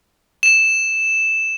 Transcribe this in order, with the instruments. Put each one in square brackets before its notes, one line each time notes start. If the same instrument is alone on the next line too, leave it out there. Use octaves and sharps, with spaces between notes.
[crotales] E7